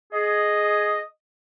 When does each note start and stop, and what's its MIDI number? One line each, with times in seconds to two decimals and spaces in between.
0.13 0.98 68
0.13 1.04 75